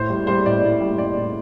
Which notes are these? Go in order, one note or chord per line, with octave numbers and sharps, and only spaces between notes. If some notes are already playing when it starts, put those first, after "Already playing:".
Already playing: A2 C5
G3
G3 C5
A2 D5
A2
G3
G3 D5
A2